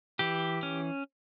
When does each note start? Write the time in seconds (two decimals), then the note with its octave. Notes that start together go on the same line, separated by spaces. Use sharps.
0.19 E3 G4
0.63 C#4